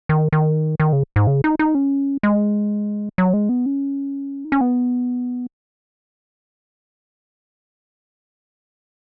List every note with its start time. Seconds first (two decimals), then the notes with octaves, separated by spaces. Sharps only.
0.09 D#3
0.33 D#3
0.80 D#3
0.93 C#3
1.16 G#2
1.27 C#3
1.44 D#4
1.59 D#4
1.75 C#4
2.23 G#3
3.18 F#3
3.34 G#3
3.49 B3
3.66 C#4
4.44 D#4
4.52 C#4
4.61 B3